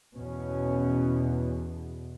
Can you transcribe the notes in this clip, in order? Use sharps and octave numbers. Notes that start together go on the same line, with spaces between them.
E2 B2 C#4